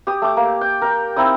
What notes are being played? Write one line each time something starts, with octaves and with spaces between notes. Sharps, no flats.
G4 D#6
A3 D6
A#3
G5
A#4 G5
C4 D#4 E4 D#6